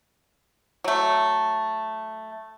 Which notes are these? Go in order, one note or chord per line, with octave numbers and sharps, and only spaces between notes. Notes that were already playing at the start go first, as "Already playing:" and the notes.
F#3 A3